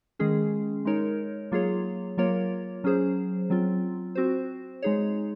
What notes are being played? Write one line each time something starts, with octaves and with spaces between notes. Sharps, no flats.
D#3 G#3 C#4 G#4
G#3 D#4 A#4 C#5
F#3 A#3 F4 G#4 C#5
F#3 A#3 F4 A#4 C#5
F#3 C#4 G#4 C5
F#3 C4 F4
C4 F#4 C5
G#3 D#4 G#4 C#5